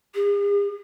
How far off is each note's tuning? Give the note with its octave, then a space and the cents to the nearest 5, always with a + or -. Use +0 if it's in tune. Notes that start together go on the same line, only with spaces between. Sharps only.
G#4 -45